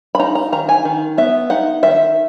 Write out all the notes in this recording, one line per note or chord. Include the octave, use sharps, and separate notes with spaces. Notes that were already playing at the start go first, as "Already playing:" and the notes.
B5
D#4 A#5
A#5
D#3 A#5
G#5
D#3
B3 E5
D#4 F#5
D#3 E5